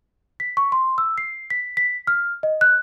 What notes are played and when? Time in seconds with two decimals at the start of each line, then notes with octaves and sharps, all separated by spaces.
0.40 B6
0.57 C#6
0.72 C6
0.98 E6
1.18 C7
1.50 B6
1.77 B6
2.07 F6
2.43 D#5
2.61 F#6